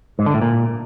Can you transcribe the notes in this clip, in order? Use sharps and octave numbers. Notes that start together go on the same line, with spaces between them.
G#2
D3
A2
A#2